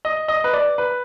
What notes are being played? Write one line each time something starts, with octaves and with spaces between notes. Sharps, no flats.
D#5
D#5
B4
D5
B4